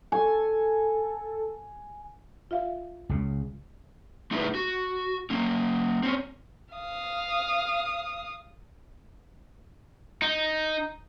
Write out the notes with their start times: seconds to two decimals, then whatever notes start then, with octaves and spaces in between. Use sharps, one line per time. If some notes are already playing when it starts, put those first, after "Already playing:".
0.12 A4 G#5
2.51 F4 E5 F5
3.09 C#2 C#3
4.31 A3 D#4 E4 G#4 B4
4.55 F#4
5.30 A#3 C#4
6.03 C4 C#4
6.74 F5 D#6
10.22 D#4